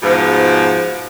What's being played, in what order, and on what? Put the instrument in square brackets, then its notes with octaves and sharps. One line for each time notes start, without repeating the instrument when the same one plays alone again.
[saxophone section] G#2 B2 F3